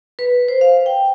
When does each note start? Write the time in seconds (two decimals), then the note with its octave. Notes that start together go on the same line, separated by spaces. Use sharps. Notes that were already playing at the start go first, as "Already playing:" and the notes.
0.19 B4
0.48 C5
0.61 F5
0.86 G5